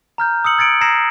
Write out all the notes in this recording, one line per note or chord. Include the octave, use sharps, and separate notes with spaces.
A#5 F6 G6
D#6 E6 C#7 F#7
E6 G#6 A6 C#7 D7 F#7
A#5 E6 G#6 A#6 C7 E7